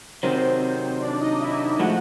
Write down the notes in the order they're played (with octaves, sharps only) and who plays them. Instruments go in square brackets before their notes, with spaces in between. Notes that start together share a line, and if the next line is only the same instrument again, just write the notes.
[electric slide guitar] C3 D#3 F#3 [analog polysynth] C4 C5
[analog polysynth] D4 D5
D#4 D#5
E4 E5
[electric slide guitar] A2 F3 G#3 [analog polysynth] F#4 F#5